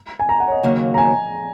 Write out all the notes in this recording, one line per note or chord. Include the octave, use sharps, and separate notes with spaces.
G#5
A#5
F#5
C#5
D#5
D#2 C#3 F#3 A#3
A#5
G#5